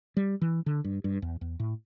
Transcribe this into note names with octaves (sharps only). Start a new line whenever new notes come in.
G3
E3
D3
G2
G2
E2
E2
A2